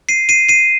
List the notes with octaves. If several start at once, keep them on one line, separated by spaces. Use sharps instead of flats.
C7 D#7
C7 D#7
C7 D#7